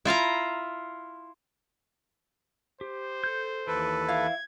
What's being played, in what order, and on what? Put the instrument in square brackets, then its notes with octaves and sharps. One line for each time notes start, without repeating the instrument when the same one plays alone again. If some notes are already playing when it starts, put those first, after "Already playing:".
[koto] E4 F4 F5 A#5
[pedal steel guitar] G4 [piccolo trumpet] C5
[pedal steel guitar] A4 G6
[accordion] D#2 A4 B4 [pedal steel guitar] E3
[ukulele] E4 F5 [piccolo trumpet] G#6